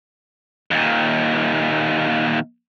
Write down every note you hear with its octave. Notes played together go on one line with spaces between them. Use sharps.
D#2 A#2